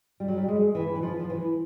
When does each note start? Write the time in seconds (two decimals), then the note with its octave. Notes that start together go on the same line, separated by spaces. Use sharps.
0.20 G3
0.28 F#3
0.38 G3
0.48 G#3
0.75 E3
0.95 E3
1.03 F3
1.19 F3
1.30 E3